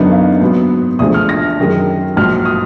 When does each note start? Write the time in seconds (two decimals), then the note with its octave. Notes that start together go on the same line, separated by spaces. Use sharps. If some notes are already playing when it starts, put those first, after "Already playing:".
Already playing: F#2 D3 F#3 B3 D#4
0.12 F5
0.41 G#2 F#3 B3
0.99 D2 D3 F3 G#3 D#6
1.14 F6
1.29 A#6
1.58 F#2 D#3 G#3
2.16 A#1 G#2 F#3 F6
2.45 D#6